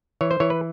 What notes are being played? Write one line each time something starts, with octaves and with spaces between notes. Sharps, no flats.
E3 C#5
C5
E3 C#5
B4